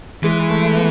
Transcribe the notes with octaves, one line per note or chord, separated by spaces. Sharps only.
E3 G#3
A3
A3
B3